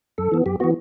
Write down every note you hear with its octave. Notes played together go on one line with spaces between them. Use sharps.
F#2 A4
E3 B3
F#2 G4
E3 B3 F#4